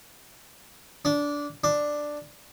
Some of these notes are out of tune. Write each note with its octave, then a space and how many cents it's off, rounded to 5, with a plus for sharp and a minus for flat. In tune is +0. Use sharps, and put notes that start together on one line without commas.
D4 -15
D4 +5